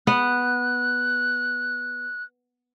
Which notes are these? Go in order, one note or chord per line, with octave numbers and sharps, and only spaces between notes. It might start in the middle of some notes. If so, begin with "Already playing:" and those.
B3 F#5 F#6